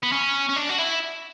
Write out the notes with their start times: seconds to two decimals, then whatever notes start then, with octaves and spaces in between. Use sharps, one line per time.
0.03 B3
0.12 C#4
0.49 C#4
0.56 D4
0.69 F#4
0.79 E4